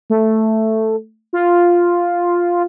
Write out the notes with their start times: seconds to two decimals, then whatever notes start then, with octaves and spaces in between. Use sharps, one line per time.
0.10 A3
1.33 F4